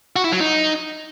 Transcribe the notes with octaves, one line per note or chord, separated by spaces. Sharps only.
F#4
E4
F#3
D#4